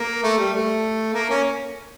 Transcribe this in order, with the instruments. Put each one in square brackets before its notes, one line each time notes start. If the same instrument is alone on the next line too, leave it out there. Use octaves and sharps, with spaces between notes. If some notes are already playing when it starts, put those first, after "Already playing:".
Already playing: [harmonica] A#3
A3
G3
A3
A#3
C#4